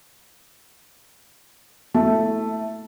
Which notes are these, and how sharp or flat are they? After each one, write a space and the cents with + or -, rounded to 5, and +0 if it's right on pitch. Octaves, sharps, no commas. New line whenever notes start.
A3 +0 E4 -20 A5 +0